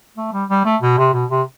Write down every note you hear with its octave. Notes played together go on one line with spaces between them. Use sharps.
A3
G3
G3
A3
B2
C3
B2
C3